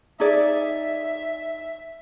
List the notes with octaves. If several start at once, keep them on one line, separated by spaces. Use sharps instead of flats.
D#4 G#4 D5 E5